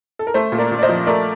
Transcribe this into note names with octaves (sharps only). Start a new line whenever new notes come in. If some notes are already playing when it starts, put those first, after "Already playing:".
A4
A#4
A3 A4 C5
A#2
A#4 D5
A#2
D5
C5 D#5
F3
A3 A#4 D5